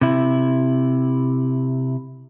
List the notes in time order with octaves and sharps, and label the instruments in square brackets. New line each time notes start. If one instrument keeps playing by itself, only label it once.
[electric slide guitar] C3 E4